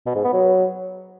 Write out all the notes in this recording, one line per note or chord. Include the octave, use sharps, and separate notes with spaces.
B2
G#2
B3
F#3